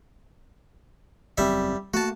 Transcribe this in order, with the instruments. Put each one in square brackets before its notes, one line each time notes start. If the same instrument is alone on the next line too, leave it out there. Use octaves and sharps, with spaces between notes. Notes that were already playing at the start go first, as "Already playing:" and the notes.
[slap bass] F#1 E2 C4 [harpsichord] G3 E5
[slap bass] A3 A#3 [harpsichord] F#4 A5